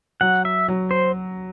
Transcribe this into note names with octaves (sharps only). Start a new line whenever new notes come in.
F#3 F#5
E5
F#3
C5